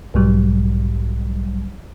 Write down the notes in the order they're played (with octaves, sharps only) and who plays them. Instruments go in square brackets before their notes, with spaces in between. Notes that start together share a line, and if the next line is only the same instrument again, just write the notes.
[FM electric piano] B1 G#2 F#3 G3